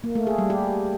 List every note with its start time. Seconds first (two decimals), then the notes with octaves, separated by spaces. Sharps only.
0.04 A#3
0.15 A3
0.27 G#4
0.38 G3
0.50 G4